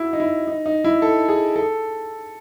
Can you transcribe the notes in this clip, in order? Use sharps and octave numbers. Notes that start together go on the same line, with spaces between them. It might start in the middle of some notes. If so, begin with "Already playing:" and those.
Already playing: E4 F#4
D#4
E4
D#4
D#4
E4
A4
G#4
A4